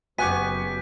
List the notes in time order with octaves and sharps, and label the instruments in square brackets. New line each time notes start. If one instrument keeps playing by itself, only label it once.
[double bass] F#1 [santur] B3 C#4 G4 [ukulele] G#5 [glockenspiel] D6 F#6 B6